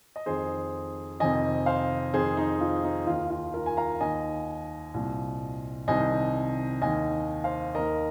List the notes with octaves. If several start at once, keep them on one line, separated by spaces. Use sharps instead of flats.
D#5
F2 D#3 G#4 C5
F2 C3 D#3 D#5 G#5
C5 F5
F2 D#3 G#4 C5
D#4
F4
D#4
D#2 D#3 F4
F4
F4 A#4
G#5
F5 A#5
D#2 D#3 D#5 G#5
C2 A#2
C2 C3 D#3 D#5 G#5
D#2 D#3 D#5 G#5
C5 F5
D#2 D#3 A#4 D#5